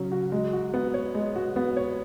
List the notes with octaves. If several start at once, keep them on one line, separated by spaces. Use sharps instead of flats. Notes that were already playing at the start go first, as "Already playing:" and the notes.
Already playing: C#3 F#3 C#4
F#4
G#3
F#4
B3
C#5
G#3
F#4
B3
C#5